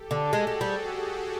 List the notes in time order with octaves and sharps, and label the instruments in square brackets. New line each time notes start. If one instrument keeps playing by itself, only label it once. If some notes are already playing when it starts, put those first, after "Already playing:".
Already playing: [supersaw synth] G4 A4
[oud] D3
[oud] G#3 [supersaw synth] F#4 G#4
[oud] G#3
G3